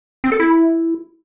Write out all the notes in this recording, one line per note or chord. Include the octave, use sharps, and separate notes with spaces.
C4
A4
E4